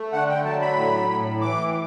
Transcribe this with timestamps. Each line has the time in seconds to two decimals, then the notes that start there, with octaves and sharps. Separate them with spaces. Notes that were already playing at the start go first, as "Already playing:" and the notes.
Already playing: A3
0.13 D3 F#5
0.29 G5
0.45 F#3 A5
0.61 B5
0.77 A2
1.09 A2
1.41 E3 D6